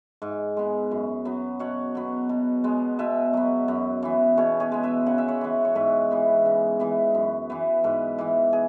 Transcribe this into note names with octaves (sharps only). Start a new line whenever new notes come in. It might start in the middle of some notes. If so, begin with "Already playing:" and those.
G#2
G#3 B3
F#2
F#3 B3
B2 C#5 F#5
F#3 B3
B2
G#3 B3
B2 B4 E5
F#3 B3
F#2
E3 B3
B2 G#4 C#5
G#4 C#5
G#3 B3
B4 E5
C#3 F#5
E5
C#5 F#5
E3 B3
C#5
G#2 B4 E5
E3 B3
C#3
E3 B3
F#2
E3 B3
G#2 B4 E5
E3 B3
G#4